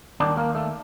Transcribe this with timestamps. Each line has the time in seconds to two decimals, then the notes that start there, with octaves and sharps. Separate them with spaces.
0.20 D#2 D#3 G3 D4
0.37 A#3
0.55 A3